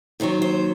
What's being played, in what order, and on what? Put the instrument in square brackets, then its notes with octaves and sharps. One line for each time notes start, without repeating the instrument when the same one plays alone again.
[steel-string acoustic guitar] D#2 D#3 F#3 C5
C5